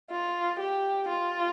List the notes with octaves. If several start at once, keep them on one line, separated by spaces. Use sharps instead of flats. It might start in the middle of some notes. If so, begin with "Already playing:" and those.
F4
G4
F4